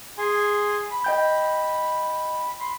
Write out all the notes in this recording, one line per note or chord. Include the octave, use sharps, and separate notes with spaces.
G#4 G#5 C6
B5
D#5 G5 G6
B5 C6